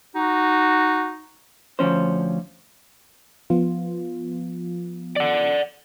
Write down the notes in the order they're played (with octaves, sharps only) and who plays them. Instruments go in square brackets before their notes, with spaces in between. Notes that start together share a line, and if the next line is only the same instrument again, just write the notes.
[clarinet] D#4 [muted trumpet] F#4
[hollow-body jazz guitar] D2 F3 C#4 C5
[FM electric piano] F3 B3 F4
[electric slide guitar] D5 F#5